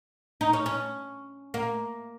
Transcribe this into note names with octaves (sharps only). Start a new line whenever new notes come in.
D#4
C#4
C#4
A#3